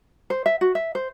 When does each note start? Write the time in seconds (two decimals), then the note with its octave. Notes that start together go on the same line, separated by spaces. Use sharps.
0.30 C5
0.46 E5
0.61 F#4
0.75 E5
0.95 C5